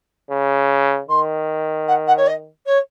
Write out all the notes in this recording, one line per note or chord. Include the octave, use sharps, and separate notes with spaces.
C#3
D#3 C6
F#5
F#5
C#5
D#5
C#5